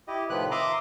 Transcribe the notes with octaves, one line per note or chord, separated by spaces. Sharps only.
E4 G4 D#5
A2 C3 D#3 F3 B4 F#6
E5 A#5 C6 D6 D#6